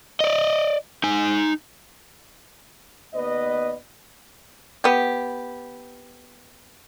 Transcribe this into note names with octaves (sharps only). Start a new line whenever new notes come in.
D5 D#5
D#4 G#5
D#2 B3 B4 D5 D#5
B3 G4